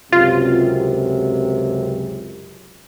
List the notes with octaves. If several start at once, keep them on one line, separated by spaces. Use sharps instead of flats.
C#2 F#2 C3 F4